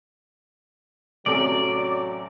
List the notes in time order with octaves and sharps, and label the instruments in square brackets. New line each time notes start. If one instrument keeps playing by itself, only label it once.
[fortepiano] A1 C3 A4 [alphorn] F#3 [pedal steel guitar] D5